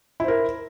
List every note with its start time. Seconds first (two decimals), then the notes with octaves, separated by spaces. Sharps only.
0.20 E4
0.24 C5
0.28 A#4